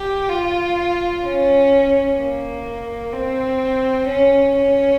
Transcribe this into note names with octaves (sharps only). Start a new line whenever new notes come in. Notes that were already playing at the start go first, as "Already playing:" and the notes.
Already playing: G4
F4
C#4
A#3
C4
C#4
C#4